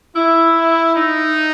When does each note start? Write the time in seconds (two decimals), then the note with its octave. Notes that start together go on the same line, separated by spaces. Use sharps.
0.16 E4
0.95 D#4